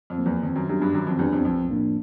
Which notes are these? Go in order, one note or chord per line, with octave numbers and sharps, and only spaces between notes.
F2
F3 A#3
E2
F2 D#3
F#2
F#2 G3 B3 D4 G4
G2
F#2 D#3
F2
E2 G3 B3 D4 G4
F2
B1 F2
A2 F3 A#3 D4